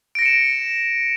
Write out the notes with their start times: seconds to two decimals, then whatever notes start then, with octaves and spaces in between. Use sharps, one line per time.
0.15 D7
0.19 A#6
0.22 C#7
0.26 E7